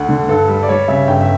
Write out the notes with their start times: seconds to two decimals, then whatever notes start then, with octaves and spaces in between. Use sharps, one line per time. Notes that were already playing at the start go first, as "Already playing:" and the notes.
Already playing: D2 F#5
0.09 D3
0.28 G2 A4
0.48 G3
0.63 D5
0.69 G3 C#5
0.88 C#3 E5
1.07 G1 G5
1.21 E5